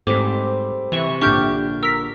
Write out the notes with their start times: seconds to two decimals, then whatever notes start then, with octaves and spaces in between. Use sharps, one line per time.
0.07 G#2 G3 A3 C4 D6 B6
0.92 C3 E3 E5 C#6
1.21 A#1 D3 D4 G4 C#6 F6 G6
1.83 A#4 E6 B6